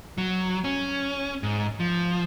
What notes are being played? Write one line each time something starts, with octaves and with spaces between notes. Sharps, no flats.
F#3
C#4
G#2
F3